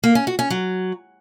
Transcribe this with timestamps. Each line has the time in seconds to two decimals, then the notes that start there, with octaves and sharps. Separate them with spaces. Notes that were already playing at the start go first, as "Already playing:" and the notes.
0.04 A#3
0.15 C#4
0.27 F#4
0.39 C#4
0.50 F#3